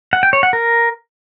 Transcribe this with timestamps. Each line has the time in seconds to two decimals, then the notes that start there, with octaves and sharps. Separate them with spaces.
0.13 F#5
0.23 G5
0.33 C#5
0.43 F#5
0.53 A#4